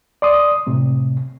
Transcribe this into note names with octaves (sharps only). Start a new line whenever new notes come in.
D5 C6 D#6
A2 C3